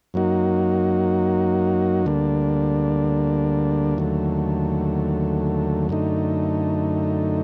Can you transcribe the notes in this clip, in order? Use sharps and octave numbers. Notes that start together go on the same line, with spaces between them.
F#2 F#3 A#3 D#4 F#4
D2 D3 G3 A#3 D4
D#2 D3 F#3 A3
F#2 D3 A3 D#4